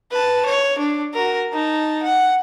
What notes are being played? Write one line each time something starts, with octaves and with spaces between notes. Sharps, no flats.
B4 A5
C#5
D4
F#4 A#4
D#4 A5
F#5